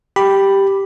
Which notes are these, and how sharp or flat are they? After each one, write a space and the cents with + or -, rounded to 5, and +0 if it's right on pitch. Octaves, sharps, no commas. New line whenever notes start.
G4 +0 B5 +0